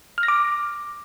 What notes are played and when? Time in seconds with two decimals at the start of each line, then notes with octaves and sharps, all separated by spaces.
0.18 F6
0.23 A#6
0.28 D6